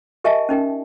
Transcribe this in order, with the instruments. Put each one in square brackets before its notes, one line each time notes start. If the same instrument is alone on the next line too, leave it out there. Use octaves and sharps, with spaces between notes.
[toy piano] G4 A#4 D#5 E5 G#5 A5
C#4 D#4 A#4 G5